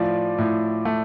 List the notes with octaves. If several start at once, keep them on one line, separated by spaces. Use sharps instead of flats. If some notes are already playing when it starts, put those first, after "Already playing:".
Already playing: A2 F3 D5
A2
A3